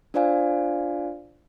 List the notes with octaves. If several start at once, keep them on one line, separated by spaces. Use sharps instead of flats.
D4 F4 C5 D5 F5 G#5